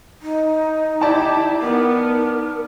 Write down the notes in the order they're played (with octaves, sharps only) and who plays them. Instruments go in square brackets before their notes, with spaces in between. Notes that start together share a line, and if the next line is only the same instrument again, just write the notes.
[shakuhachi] D#4
[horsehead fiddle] E4 G4 [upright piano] D5 A5
[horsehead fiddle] B3 D#4 [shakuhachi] A#4